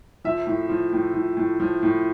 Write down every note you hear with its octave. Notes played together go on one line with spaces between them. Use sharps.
F3 E5
A2
F3
A2
F3
A2
F3
A2